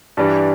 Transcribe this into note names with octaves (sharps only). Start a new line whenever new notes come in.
G2 E3 G3 D4